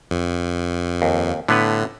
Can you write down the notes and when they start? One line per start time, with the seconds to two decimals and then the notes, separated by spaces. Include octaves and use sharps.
0.11 F2
1.02 D#2
1.48 A2 D3 B3 B4